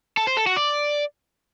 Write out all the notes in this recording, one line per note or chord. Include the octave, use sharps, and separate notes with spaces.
A4
C5
A4
F#4
D5